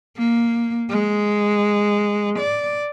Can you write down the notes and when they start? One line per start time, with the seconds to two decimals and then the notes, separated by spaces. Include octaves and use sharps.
0.17 A#3
0.90 G#3
2.39 D5